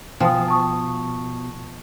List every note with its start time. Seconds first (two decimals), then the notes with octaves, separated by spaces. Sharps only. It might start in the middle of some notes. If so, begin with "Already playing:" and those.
0.20 B2 F3 G5 G#5 D#6
0.48 A5 C#6 D#6